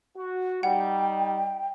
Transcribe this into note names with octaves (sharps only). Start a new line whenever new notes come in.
F#4
G3 D#4 F#5 G5